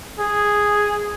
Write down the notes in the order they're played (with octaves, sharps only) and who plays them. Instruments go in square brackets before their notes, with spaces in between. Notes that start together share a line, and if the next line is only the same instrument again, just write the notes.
[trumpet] G#4